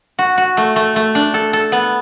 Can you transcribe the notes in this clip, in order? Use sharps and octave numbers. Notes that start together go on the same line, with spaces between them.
F#4
F#4
A3
A3
A3
D4
A4
A4
B3